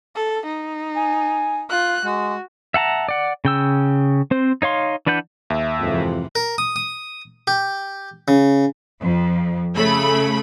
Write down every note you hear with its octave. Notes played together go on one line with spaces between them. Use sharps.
A4
D#4
G#5
F4 F#6
G#3 F#4
E5 F#5 A5 A#5
D5 F#5
C#3 G5 E6
C4 C5
D#4 C#5 F5 C6
E3 D4 B4 F#5 G6
D#2 E5
F2 G#2 C3 E3
A#4
D#6
D#6
G4
C#3
F2
C#3 A3 B5